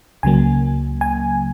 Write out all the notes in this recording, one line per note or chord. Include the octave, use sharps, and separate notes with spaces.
C#2 C#3 F#3 A#3 G#5
G#5